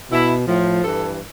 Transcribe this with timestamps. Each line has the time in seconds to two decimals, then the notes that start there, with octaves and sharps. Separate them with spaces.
0.11 B2 E4
0.47 A2 F3
0.82 G2 E3 A4